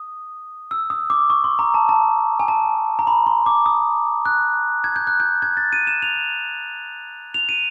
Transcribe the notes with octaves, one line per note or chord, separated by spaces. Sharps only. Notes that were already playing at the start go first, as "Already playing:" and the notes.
Already playing: D#6
E6
D#6
D6
C#6
C6
A#5
A5
A5
G#5
A5
A#5
B5
C6
D6
D#6
F#6
G#6
G6
F#6
G6
G#6
A6
D#7
E7
F7
F7
D#7